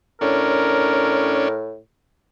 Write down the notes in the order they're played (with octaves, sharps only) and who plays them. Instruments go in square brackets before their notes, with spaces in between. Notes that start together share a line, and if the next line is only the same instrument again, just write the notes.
[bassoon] A2 [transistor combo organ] C#4 D4 [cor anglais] A#4